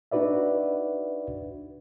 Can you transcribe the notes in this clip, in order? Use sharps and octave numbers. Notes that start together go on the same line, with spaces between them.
D4 D#4 F#4 B4 D5 E5